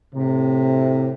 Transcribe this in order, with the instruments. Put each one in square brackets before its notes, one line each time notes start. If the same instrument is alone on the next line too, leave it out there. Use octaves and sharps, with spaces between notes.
[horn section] A2 C3